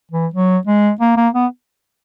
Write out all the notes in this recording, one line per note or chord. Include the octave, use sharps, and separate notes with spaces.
E3
F#3
G#3
A#3
A#3
B3